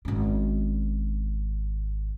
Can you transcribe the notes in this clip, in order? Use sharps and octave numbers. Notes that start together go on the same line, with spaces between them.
G#1 C#4